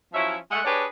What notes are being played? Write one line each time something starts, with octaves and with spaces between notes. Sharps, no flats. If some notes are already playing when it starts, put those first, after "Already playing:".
F3 F#3 C#4 E4 C#5 E5
G#3 A3 E5 F#5
D4 G4 G#4 B4 C#5 D5